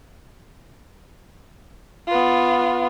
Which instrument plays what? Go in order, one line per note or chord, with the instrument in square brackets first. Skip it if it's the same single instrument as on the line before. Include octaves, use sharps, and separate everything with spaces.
[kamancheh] B3 F4